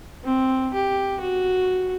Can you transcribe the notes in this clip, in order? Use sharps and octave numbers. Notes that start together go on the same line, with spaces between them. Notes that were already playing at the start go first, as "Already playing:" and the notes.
C4
G4
F#4